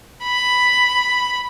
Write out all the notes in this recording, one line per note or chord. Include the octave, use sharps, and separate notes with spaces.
B5